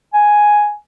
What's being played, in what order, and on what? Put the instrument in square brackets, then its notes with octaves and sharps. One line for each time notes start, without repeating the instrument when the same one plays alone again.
[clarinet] G#5